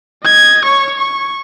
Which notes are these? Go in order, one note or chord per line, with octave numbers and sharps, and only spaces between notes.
D#5 G#6
C#5 C#6
C#6